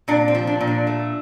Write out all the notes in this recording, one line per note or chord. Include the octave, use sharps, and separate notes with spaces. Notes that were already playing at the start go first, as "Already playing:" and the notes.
A#2 D4
C4
F3
D4
A#2
D4
A3